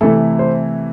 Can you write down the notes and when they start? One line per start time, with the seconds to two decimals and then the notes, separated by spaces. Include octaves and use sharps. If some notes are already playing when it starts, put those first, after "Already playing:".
0.01 C3 E3 A3 E4 A4
0.39 C5